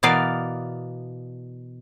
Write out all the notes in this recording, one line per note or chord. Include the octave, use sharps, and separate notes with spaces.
B2 E3 B3 A#4 D5 F5